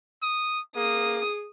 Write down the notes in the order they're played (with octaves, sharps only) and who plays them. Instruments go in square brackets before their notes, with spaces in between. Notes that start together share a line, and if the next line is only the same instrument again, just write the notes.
[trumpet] D#6
[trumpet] A#3 [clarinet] G#4 [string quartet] D#6